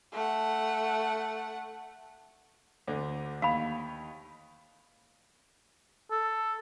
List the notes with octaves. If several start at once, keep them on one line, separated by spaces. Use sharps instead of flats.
A3 F#5
D2 D3
D#2 F5 B5
A4